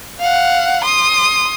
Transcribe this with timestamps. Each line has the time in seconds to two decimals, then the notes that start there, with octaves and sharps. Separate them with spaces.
0.19 F5 F#5
0.84 C6 D#6